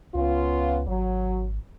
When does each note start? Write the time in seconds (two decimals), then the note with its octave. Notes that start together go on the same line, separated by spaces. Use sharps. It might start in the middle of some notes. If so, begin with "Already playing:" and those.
0.15 C#2 B3 C#4 F4
0.88 G#1 F#3